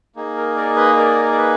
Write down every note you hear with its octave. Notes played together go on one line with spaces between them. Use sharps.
A#3 D#4 G#4
A#4
A#4 D5
B4 D#5
A#4 D5
D5
B4